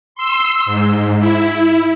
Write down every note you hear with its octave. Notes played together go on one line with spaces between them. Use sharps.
C6 E6
G#2
E4